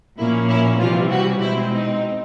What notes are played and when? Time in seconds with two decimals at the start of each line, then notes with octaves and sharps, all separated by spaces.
0.17 A#2 F3 A#3 C#4 E4
0.49 E4
0.78 C3 E3 F3 G3 F4
1.09 F#3 F#4
1.39 B2 G#3 C4 E4
1.71 D#4